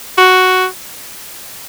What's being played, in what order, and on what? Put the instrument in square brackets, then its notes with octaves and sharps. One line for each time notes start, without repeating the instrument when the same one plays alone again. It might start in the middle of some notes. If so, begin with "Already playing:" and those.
[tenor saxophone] F#4